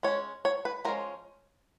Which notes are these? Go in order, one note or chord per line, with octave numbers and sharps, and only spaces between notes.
G#3 C#4 C#5
C#5
B4
F3 G#3 C#4 A#4